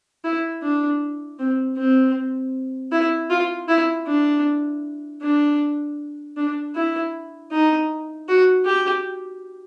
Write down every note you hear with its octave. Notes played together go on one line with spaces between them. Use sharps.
E4
D4
C4
C4
E4
F4
E4
D4
D4
D4
E4
D#4
F#4
G4